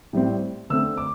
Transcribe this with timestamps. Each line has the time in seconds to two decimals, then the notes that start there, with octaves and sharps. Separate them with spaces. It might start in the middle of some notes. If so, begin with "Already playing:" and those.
0.13 A2 G3 C4
0.70 D3 A3 C4 E6
0.97 D6